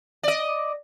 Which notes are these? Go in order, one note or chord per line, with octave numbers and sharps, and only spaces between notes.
D5 D#5